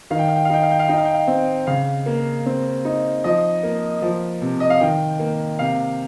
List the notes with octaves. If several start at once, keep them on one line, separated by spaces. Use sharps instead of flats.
D#3 F5
G5
F5
G5
F5
D#4 G5
F5
G5
F5
D#4 G5
F5
G5
F5
C4
C#3 F5
A#3
C4
D#4
F3 D#5
A#3
F3
C3
D#5
F5
D#3 G5
A#3
C3 F5